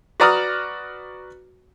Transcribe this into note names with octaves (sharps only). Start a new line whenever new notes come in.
F#4 B4 D5 A#5 D#6 F6